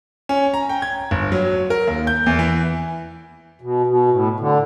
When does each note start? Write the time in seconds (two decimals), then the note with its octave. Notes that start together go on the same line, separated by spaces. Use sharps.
0.29 C#4
0.54 A#5
0.69 G5
0.82 G#6
1.11 G1
1.32 F#3
1.70 A#4
1.87 D#2
2.07 G6
2.26 E2
2.39 E3
3.61 B2
3.87 B2
4.11 A2
4.40 D3